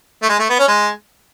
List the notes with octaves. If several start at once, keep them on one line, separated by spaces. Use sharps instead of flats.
A3
G#3
A3
B3
C#4
G#3